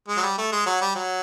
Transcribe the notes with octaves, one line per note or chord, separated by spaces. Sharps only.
G#3
F#3
G3
A3
G#3
F#3
G3
F#3